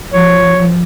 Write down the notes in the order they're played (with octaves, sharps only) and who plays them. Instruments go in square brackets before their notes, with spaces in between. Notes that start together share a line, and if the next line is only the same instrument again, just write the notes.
[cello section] F3 [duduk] C#5